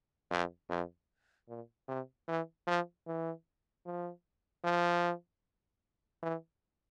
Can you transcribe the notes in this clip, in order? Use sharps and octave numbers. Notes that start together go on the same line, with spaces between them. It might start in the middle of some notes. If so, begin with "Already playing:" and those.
F2
F2
A#2
C3
E3
F3
E3
F3
F3
E3